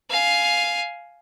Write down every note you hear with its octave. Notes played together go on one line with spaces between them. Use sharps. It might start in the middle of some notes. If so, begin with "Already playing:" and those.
F5 G#5